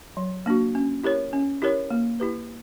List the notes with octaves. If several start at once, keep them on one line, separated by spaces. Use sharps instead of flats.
F#3
A#3 D4 F#4
C#4
E4 G4 A#4 C#5
C#4
E4 G4 A#4 C#5
A#3
E4 G4 B4